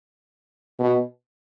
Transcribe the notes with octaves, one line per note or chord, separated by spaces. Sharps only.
B2